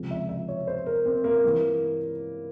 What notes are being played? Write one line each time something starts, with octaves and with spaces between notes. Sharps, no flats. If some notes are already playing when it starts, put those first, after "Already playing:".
Already playing: C#2 C3 F3
E5
E5
C#5
C5
A#4
C4
A#3
G2 E3 A#3